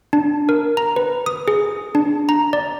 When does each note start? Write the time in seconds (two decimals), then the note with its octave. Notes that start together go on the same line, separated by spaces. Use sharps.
0.13 D4
0.49 A#4
0.77 A#5
0.96 B4
1.26 D#6
1.48 G#4
1.95 D4
2.29 A#5
2.53 D5